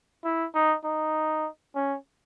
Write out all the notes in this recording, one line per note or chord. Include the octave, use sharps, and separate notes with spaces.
E4
D#4
D#4
C#4